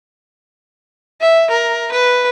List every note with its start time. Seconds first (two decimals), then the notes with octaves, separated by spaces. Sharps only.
1.21 E5
1.51 A#4
1.92 B4